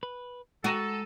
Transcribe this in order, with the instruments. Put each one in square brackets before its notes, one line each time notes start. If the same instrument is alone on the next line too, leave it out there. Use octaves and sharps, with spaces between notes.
[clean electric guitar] B4
[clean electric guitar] G#3 A#5 [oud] F#4 [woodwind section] A4 [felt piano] A#6 D#7 E7